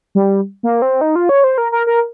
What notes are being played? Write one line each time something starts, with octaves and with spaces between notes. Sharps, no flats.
G3
A#3
C4
D#4
F4
C#5
C5
A#4
A#4
A#4